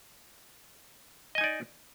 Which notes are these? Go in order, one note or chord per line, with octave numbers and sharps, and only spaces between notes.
D#4 D5 D#5 G#5